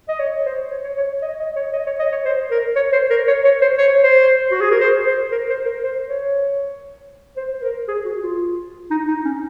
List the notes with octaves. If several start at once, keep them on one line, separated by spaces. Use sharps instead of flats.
D#5
C#5
C5
C#5
C#5
C#5
D#5
D#5
C#5
D#5
C#5
D#5
C#5
C5
A#4
C#5
C5
A#4
C#5
C#5
C5
C#5
C5
F#4
G#4
A#4
C5
C5
A#4
C5
A#4
C5
C#5
C5
C5
A#4
G#4
F#4
F4
D#4
D#4
C#4